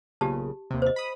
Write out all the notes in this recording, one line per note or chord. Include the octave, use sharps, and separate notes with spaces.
B1 A#2 C#3 G4 A5
D#2 C3
C5 D#5
B5 D#6